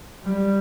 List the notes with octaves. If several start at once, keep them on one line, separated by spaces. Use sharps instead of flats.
G3